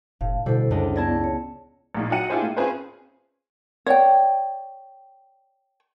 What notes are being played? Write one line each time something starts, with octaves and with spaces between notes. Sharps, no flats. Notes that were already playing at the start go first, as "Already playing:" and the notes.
F1 A2 F5
B2 D3 G3 E4 A4 C5
C#2 F#2 D4 D#5
B3 E4 D5 A5 G#6 A#6
C#5
A#1 A#2 D#4
F#3 D#4 F#4 F#5 D#7
D4 E4 F4 G4 G#4 C5
A#3
C4 C#4 F4 G#4 B4 C5
C#5 D5 G5